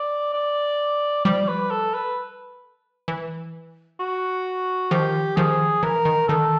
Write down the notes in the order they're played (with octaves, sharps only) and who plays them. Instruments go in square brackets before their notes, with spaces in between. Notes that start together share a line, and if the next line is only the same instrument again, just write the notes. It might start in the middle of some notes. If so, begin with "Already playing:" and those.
Already playing: [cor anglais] D5
D5
[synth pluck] F3 G3 [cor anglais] D5
[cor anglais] B4
A4
B4
[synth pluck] E3
[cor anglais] F#4
[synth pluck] D#3 F3 [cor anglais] G4
[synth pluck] D#3 F3 [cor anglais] G#4
[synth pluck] E3 [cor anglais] A#4
[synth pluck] D#3
[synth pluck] D#3 [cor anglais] A4